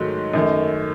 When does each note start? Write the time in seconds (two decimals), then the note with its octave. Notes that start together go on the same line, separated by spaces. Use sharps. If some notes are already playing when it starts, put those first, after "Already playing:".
Already playing: G#2 D#3 F#3 A3
0.34 F#2 D#3 A3